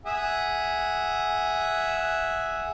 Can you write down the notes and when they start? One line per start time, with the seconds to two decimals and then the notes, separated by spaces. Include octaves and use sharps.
0.05 G#4 E5 F#5